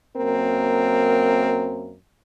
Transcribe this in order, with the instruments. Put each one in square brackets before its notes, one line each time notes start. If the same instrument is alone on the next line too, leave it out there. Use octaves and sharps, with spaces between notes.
[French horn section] F#2 A#3 C4 A#4